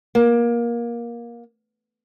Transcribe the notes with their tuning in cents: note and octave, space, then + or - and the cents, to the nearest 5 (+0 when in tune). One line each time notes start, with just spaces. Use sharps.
A#3 +20